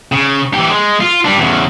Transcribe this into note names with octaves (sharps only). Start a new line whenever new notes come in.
C#3
E3 G4
G#3
F4
G3 D4
E2 C#3